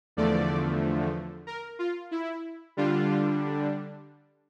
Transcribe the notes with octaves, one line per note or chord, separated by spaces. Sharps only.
E2 D3 F3 A3 D5
A#4
F4
E4
D3 G3 D4 F4